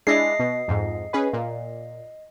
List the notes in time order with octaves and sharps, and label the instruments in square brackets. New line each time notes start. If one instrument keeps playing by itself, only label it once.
[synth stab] G#3 D4 E4 [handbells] D#5 A#6 C7
[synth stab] B2
F2 G#2
C#4 G#4 B4
A#2